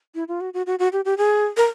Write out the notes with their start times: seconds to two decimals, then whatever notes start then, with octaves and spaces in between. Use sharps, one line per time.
0.15 E4
0.28 F4
0.41 F#4
0.54 F#4
0.66 F#4
0.79 F#4
0.92 G4
1.05 G4
1.18 G#4
1.57 A#4